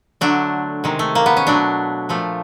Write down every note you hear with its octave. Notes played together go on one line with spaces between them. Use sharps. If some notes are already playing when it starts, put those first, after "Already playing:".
D3 F#3 A3 D4
C3 D#3 G#3
A3
A#3
B3
C#4
B2 F#3 A3 D4
A#2 F3 A3